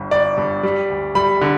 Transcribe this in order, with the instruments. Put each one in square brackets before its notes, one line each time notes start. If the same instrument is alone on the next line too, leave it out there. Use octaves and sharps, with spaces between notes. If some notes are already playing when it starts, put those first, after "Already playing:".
Already playing: [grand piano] G1 G2
G1 D5
G2
G3
D2
G3 B5
D3